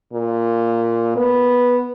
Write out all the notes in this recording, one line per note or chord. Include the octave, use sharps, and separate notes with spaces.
A#2
B3